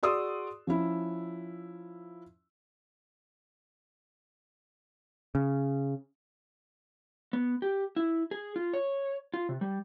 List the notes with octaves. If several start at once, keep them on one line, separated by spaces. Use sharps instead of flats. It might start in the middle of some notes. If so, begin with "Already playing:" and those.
F#4 G#4 D5 C6 D#6 E6
F3 C#4 E4
C#3
B3
G4
E4
G#4
F4
C#5
F4
C3
G3